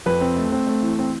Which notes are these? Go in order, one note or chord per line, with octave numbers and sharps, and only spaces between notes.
F2 B4
C4
A3
C4
A3
E3
C4